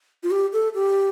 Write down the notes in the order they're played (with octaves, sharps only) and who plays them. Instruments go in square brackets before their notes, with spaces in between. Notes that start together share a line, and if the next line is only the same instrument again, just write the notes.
[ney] F4
G4
A4
G4